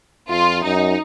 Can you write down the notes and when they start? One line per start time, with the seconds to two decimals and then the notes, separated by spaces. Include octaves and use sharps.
0.29 F2 F4
0.63 F#2 D#4